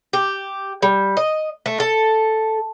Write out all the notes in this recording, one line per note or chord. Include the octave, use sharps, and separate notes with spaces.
G4
G3
D#5
A3
A4